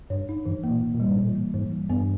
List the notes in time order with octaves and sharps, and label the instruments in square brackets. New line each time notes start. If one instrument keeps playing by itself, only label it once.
[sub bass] G2 [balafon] C#5
[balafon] D#4
[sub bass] G2 [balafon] E3
[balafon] A#3
[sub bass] A#2
[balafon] E3
[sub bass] A#2
[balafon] G3
[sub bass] G#2
[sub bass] A#2 [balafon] E3
[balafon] A#3
[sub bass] G#2 [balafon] E3
[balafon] G3
[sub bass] G2 [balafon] B3